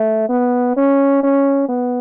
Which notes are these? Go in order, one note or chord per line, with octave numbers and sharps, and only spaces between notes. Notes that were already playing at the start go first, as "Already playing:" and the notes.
Already playing: A3
B3
C#4
C#4
B3